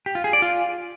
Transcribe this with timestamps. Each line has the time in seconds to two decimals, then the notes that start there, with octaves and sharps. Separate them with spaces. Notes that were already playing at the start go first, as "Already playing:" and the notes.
0.06 G4
0.15 F4
0.24 G#4
0.33 D5
0.42 F4